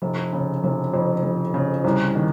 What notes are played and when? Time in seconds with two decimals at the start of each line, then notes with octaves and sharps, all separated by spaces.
0.02 F1
0.33 C#3
0.64 F1
0.94 F2
1.23 F1
1.54 C#3
1.84 C2
2.15 D#3